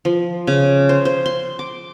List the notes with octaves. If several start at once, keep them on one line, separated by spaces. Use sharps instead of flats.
F3
C#3
C5
C5
C6
D6